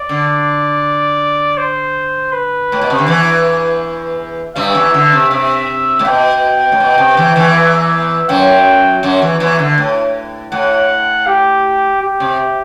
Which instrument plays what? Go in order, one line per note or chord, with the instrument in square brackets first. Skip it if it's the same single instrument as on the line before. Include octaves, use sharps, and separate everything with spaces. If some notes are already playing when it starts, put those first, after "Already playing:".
Already playing: [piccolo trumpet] D5
[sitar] D3
[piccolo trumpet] C5
B4
[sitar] A2
B2
C3
D3
E2 E3
[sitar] G2 G3 [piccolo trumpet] E5
[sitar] E2 E3
D3
C3
[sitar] C3 [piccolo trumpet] E5
[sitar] A2
[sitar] B2 [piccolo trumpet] G5
[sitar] A2
B2
C3
E2 E3
E2 E3
[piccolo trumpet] E5
[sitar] F#2 F#3 [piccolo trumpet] G5
[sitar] F#2 F#3
E2 E3
E2 E3
D3
A2
[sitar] A2 [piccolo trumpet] F#5
[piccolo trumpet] G4
G4
[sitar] C3